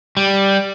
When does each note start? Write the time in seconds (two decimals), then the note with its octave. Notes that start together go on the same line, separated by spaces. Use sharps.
0.17 G3